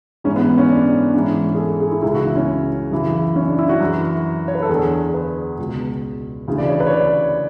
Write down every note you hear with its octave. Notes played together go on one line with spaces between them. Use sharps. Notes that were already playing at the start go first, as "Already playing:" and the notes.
G#2 E3 C#4
B3
C#4
D4
G#2 E3 C#4
G#4
A4
G#4
E4
C#2 C#3 E3 E4
F#4
E4
C#4
F#2 C#3 E3
C#4
D4
E4
F#4
F#2 E3
C#5
B4
A4
E2 D3 G#4
B4
C#2 B2
D2 C#3 E3
D5
C#5
B4
C#5
D5